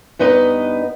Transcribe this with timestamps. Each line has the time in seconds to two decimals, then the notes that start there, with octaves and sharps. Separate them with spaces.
0.19 G2 B3 D#4 B4 D#5